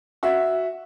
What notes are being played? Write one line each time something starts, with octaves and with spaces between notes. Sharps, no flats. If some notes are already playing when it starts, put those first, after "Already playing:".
F#4 E5